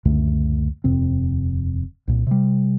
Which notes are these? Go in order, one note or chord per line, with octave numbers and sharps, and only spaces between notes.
C#2 F#2 D3 A3
D#1 F2 C3 C4
C2 A#2
C3 G3